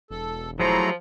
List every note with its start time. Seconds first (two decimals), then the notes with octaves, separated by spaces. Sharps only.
0.10 E1 A4
0.60 F3 F#3 A3 E4 G#4 C5 A#5